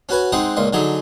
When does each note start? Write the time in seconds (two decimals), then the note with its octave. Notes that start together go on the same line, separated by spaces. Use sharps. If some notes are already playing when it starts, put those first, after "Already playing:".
0.09 C#4 F#4 B4 G#5
0.32 G#3 C4 D#4 D#5 F#5
0.57 C#2 A#2 D#5
0.73 D3 F#3 D#4 G#4